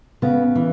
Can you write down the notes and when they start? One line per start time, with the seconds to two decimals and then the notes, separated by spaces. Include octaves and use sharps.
0.22 C#3 B3
0.56 E3